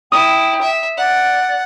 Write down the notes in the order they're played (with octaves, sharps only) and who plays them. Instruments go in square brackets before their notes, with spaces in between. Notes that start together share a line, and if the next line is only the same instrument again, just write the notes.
[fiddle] E4 [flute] G5 [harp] D#6
[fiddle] E5
[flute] D5 [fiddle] F#5